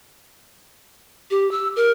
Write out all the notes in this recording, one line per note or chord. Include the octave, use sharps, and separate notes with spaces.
G4
E6
A#4